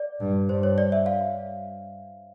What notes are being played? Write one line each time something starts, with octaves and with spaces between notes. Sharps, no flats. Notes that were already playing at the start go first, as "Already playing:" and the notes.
Already playing: D5
G2
G2 C5
C#5
D5
E5
F5